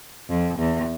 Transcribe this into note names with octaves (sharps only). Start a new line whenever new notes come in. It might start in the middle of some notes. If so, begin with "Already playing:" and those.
F2
E2